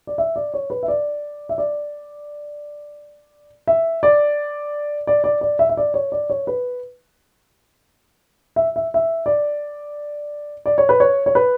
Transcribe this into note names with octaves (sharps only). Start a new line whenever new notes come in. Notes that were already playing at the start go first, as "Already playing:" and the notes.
D5
E5
D5
C#5
B4
E5
D5
E5
D5
E5
D5
D5
D5
D5
E5
E5
D5
C#5
D5
C#5
B4
E5
E5
E5
D5
D5
C#5
B4
C#5
C#5
B4